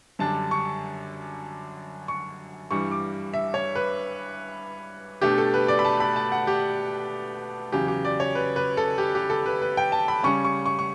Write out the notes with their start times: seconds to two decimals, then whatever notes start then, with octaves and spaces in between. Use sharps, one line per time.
0.19 F#2 D3 G3 D4 A5
0.51 C#6
2.08 C#6
2.71 G2 E3 G3 C#6
2.92 D6
3.34 E5
3.54 C#5
3.75 B4
5.21 B2 A3 D4 G4
5.38 A4
5.54 B4
5.68 D5
5.79 B5
5.85 A5
6.00 B5
6.16 A5
6.32 F#5
6.47 G4
7.72 E2 C#3 F#3 G4
7.88 G4
8.05 D5
8.20 C#5
8.35 B4
8.56 B4
8.77 A4
8.98 G4
9.15 G4
9.30 A4
9.46 B4
9.62 B4
9.77 G5
9.92 A5
10.08 B5
10.24 C#3 G3 C#4 C#6
10.45 C#6
10.66 C#6
10.79 C#6